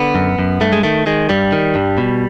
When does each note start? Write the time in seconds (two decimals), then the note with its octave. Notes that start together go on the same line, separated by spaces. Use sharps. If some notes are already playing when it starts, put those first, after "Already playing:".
Already playing: D3 B3
0.15 F#2
0.39 F#2
0.61 G2 A3
0.73 G#3
0.83 D#3 A3
1.06 D#3 G#3
1.29 G2 G3
1.52 D#3
1.75 G2
1.98 B2